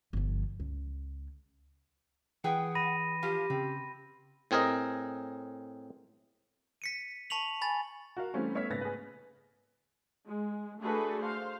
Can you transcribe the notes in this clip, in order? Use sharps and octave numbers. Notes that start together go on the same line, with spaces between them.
G1 F3
C#2
E3 G#4 B4 F#5 G5
B5 A#6 D#7
F3 F4 G4
C#3 C4
A2 C4 G#4 A#4 D#5
B6 C#7 D#7
A5 C#6 B6 F7 F#7
G#5 B5 A6
F#4 A#4 F5
E3 G3 A3 C4 C#4
A3 B3 C#5 E5 F6 B6
A#1 G#2 C#3 B4 A6 A#6
G#4 B4
G#3
A3 D4 F#4 G#4 A4 B4
C5 F5